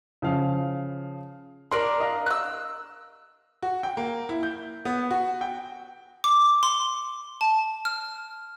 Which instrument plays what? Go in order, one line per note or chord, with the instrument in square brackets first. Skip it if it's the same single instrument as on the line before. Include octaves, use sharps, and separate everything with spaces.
[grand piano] C#3 F3 F5
[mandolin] D4 A#4 D5 [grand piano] C6
[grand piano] D#5 F5
[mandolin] E6 F#6
[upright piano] F#4
G5
A#3
E4
G6
B3
F#4
G5
[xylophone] D6
C6
A5
F6